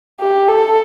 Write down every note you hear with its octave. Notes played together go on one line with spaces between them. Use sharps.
G4
A4